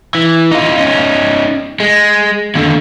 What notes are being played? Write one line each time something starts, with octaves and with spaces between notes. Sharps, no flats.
E3
D#4 F4
C#4 D#4
G#3
D#2 D3